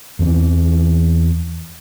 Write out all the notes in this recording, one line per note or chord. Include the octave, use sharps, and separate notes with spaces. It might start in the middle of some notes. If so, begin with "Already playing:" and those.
E2 E3 C4